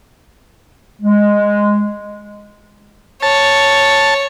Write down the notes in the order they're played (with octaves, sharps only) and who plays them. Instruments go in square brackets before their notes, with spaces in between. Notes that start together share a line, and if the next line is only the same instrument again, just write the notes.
[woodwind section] G#3
[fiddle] C#5 [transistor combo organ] A5